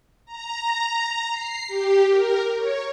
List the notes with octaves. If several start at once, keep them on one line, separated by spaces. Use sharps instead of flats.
A#5
C7
G4
A#4
C#5